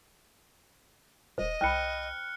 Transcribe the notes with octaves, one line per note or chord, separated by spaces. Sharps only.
D#1 C5 D#5
C2 G5 B5 F6 F#6 C#7